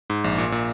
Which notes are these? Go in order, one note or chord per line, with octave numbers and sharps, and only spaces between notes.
G#2
A#1
A#2
A#2